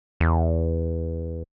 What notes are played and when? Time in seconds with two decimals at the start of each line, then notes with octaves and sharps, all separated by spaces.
0.20 E2